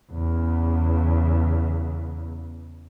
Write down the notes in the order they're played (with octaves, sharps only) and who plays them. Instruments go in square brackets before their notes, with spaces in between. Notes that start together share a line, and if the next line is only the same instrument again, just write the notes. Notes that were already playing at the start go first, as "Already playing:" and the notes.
[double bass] E2 C#3